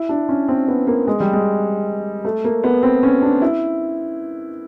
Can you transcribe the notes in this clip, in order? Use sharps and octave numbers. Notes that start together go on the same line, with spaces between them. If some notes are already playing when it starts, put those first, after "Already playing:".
Already playing: E4
D4
C#4
C4
B3
A#3
G#3
G3
G#3
A3
A#3
B3
C4
C#4
D4
E4